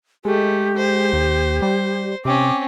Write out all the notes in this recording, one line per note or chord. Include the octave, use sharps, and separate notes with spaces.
G#3 A3 G4
C5
D#2
G3 C5
C3 C4 C#4 D6